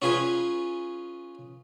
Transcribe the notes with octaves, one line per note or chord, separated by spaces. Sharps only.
C#4 F4 G#4 B4 G#5